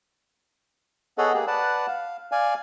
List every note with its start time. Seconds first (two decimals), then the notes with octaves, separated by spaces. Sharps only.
1.18 B3 G#4 A4 C#5 D#5 F#5
1.34 A#3 G4 G#4
1.47 B4 D5 F#5 A5
1.88 F5
2.32 D5 F5 G#5